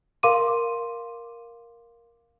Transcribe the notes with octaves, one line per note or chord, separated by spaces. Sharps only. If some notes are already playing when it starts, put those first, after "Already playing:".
A#4 F5 C6 D6 D#7